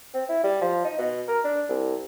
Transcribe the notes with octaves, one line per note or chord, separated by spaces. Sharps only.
C4
E4
G3
F3
D#4
B2
A#4
D4
C2